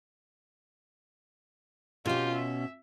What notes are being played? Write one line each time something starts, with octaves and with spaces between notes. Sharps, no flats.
B2 C#4 F4 G4
E5